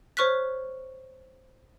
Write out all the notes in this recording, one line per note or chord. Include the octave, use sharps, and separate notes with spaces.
C5 C#5 C#6 F6 F#6 B6